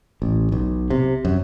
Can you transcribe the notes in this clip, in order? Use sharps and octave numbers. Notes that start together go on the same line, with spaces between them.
A1
B1
C3
F#2